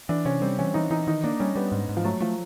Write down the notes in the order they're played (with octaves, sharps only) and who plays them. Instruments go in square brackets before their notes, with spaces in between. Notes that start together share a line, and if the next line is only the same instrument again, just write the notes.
[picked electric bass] E3 [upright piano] D4
[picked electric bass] C3 [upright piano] C#4
[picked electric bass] G3 [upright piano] C4
[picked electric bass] E3 [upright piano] C#4
[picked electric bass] E3 [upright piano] D#4
[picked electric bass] E3 [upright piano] D#4
[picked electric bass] D#3 [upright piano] D#4
[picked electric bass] A#3 [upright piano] D4
[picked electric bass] G3 [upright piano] C#4
[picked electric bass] G3 [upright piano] B3
[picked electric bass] G#2
G#2
[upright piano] F3
[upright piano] F#3 [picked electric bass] A3
[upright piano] F3 [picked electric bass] A3